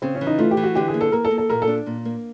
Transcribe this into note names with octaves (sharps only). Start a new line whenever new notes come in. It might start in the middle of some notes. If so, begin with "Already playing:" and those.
C#3 C4
C#4
E3
D#4
A3 F4
G4
E3
F#4
D3 G4
G#4
A#3
A4
A#3 A#4
A4
A#3
A4
A#2 A#4
A4
D4
A#2
A#3